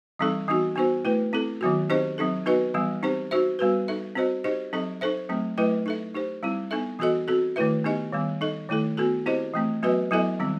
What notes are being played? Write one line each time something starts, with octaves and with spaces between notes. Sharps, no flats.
E3 G3 C4 D#4 A4
E3 B3 D#4 F#4
B3 D#4 F#4 C5
A3 E4 B4
C4 E4 A4
D#3 F#3 B3 F#4
C4 D#4 G4 C5 D#5
F#3 C4 D#4 A4
B3 D#4 F#4 B4 D#5
E3 G3 B3
C4 D#4 G4 C5
D#4 F#4 C5 E5
G3 B3 F#4 B4
D#4 A4 E5
C4 F#4 C5 D#5
D#4 G4 C5 D#5
F#3 C4 D#4 A4 D#5
D#4 A4 C5 E5
F#3 A3 C4
F#3 A3 E4 B4 D#5
D#4 A4 E5
D#4 G4 C5
G3 C4 E4
B3 D#4 A4 E5
E3 B3 F#4 A4 D#5
C4 F#4 A4
D#3 A3 E4 B4 E5
B3 D#4 G4 D#5
D#3 G3 B3
D#4 A4 D#5
D#3 A3 E4 A4
B3 F#4 A4
C4 E4 G4 C5 D#5
E3 A3 C4
F#3 B3 F#4 B4 D#5
F#3 B3 E4 A4 D#5
D#3 G3 C4